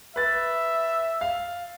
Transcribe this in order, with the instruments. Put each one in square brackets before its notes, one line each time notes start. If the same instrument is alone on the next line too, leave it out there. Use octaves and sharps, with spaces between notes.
[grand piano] B4 A6 [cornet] E5
[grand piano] F5